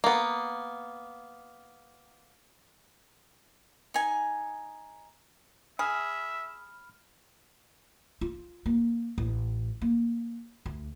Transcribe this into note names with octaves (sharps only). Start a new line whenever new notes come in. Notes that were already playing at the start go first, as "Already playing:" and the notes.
A#3 B3
D#4 G#5
G#4 E5 B5 F6
F4
A#3
A1
A#3
D2